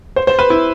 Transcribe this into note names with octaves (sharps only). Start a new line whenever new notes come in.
C5
C5
B4
E4